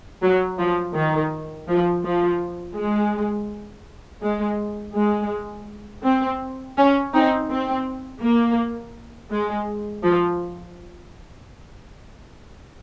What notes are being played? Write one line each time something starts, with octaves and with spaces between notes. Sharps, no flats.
F#3
F3
D#3
F3
F3
G#3
G#3
G#3
C4
C#4
C4 D#4
C4
A#3
G#3
F3